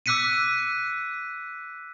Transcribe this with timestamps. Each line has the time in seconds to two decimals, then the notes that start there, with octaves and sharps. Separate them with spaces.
0.06 D6 E6 F#6 B6 C#7 D#7